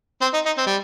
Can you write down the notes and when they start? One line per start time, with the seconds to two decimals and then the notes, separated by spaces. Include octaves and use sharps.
0.22 C4
0.34 D#4
0.46 D#4
0.58 C4
0.67 G3